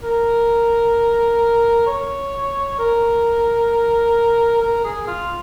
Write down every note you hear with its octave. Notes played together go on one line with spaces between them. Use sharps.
A#4
C#5
A#4
A#4
G#4
F4